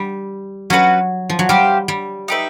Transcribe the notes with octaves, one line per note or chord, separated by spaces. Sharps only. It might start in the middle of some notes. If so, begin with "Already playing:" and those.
Already playing: G3
F#3 C#4 F#4 B4
F3
F#3
G3 G4 C5 F5
G3
D#4 G4 B4 E5